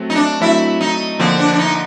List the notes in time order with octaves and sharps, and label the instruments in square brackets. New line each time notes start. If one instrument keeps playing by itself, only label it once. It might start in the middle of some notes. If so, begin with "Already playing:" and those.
Already playing: [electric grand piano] F#3 A3 C4
[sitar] D#4
D4
[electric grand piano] F#3 A3 C4 [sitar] E4
[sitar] D#4
[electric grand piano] D3 F3 A#3 [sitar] C4
[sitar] D4
D4
D#4